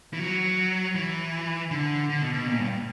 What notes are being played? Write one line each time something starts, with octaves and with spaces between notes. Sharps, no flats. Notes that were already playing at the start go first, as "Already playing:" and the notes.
E3
F#3
E3
D3
D3
B2
B2
A#2
G2